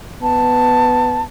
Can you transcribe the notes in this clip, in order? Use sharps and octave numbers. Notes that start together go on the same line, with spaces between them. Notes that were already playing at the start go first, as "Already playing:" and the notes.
B3 A5